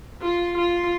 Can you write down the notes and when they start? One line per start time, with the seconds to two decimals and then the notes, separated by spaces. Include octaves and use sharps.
0.22 F4
0.57 F4